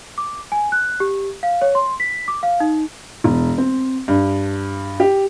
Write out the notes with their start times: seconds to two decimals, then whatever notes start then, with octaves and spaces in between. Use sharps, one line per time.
0.18 D6
0.52 G#5
0.72 F#6
1.00 G4
1.43 F5
1.62 C#5
1.75 C6
2.00 B6
2.28 D6
2.43 F5
2.60 D#4
3.24 E1
3.58 C4
4.08 G2
5.00 G4